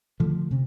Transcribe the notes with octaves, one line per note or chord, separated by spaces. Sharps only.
D3 F3 A3
C3